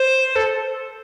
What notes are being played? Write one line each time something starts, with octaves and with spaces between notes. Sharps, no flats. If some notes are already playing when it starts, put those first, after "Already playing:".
Already playing: C5
A4